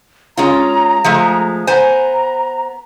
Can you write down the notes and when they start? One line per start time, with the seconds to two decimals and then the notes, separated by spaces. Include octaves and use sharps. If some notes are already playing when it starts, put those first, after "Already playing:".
0.37 G#3 C#4 F4 A#5
1.04 F3 G#3 A3
1.67 B3 C5 G#5 A#5